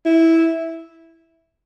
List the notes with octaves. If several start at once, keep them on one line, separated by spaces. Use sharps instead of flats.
E4